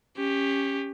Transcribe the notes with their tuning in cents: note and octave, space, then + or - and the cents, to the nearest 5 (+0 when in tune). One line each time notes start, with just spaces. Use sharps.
C#4 +0 G4 +15